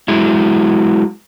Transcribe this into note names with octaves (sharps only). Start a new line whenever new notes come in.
F#3 G#3 E4